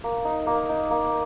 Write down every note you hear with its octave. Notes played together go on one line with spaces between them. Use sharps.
A#3
D#4
A#3
D#4
A#3